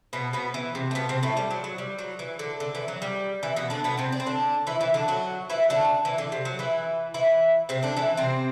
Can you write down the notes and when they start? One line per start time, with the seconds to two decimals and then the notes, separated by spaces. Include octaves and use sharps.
0.13 B2 B3
0.33 B2 B3
0.54 E3
0.75 C3
0.91 A3
0.95 B2 B3
1.09 C3 C4
1.23 A2 A3
1.37 G3
1.51 F#3
1.64 F#3
1.78 G3
1.98 F#3
2.19 E3
2.39 D3
2.60 D3
2.75 E3
2.88 F#3
3.02 G3
3.43 E3
3.56 B2 B3
3.70 D3 D4
3.84 B2 B3
3.97 C3 C4
4.12 D4
4.20 C4
4.26 D3 D4
4.67 E3 E4
4.81 E3 E4
4.94 D3 D4
5.08 F#3 F#4
5.50 E3 E4
5.70 D3 D4
6.05 E3
6.18 D3
6.32 C3
6.45 F#3
6.59 E3 E4
7.14 E3 E4
7.69 C3 C4
7.83 D3 D4
7.96 E3 E4
8.17 C3 C4